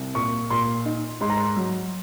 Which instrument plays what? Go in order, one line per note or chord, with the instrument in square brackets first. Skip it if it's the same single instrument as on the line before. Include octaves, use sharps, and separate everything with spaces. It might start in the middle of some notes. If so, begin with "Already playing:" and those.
Already playing: [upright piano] C2
[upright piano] A#2 [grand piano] C#6
[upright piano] A#2 [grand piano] C6
[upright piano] D#4
[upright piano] G#2 [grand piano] C6
[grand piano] A#5
C6
[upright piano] F#3